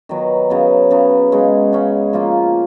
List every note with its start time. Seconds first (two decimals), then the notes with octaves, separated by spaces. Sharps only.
0.09 D#3 F#3 B3
0.50 C#3 F#3 B3
0.91 C#3 F#3 B3
1.32 C#3 G#3 C#4
1.73 C#3 G#3 C#4
2.13 F3 A#3 F4